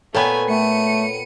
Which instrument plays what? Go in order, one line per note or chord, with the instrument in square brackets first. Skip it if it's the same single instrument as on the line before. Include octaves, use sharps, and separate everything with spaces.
[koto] A#2 B3 [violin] A3 G#5 [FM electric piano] A4 C#5 G5
[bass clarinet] A3 [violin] C#7 D#7